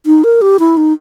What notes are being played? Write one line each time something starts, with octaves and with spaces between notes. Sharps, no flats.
D#4
A#4
G4
E4
D#4